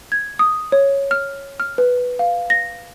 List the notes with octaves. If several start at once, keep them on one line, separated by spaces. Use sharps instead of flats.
G#6
D#6
C#5
F6
F6
B4
F5
A#6